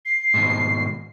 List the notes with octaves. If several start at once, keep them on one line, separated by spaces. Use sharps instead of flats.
C7
G#2 B2 D#3